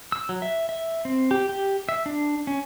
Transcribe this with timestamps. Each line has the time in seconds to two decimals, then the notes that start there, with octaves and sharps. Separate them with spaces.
0.12 E6
0.29 F#3
0.42 E5
0.69 E5
1.05 C4
1.31 G4
1.49 G4
1.89 E5
2.06 D4
2.47 C#4